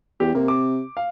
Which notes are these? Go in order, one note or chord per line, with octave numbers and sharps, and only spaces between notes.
E2 G4
C3 A#3
D6
F5